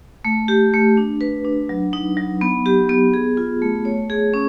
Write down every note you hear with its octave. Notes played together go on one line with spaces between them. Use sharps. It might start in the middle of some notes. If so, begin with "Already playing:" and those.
A3
G4
A3
D4
B4
D4
F#3
D#4
F#3
B3
G4
B3
G#4
F4
A3
C#5
G#4
C#4